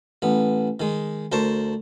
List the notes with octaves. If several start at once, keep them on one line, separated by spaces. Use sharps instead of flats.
A1 B3
D#3 G#3
D2 A#4 C5 A5 C#6